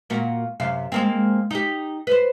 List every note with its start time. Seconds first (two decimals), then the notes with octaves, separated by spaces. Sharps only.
0.10 A#2 A#3 F#4
0.60 F#2 C3 F5
0.92 G#3 A#3 C4
1.51 D#4 G4
2.07 B4 C5